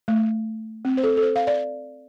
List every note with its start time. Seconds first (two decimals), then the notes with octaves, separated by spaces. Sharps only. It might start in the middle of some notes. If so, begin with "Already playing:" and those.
0.08 A3
0.85 C4
0.97 C5
1.03 A4
1.17 A4
1.22 C5
1.36 F5
1.47 D5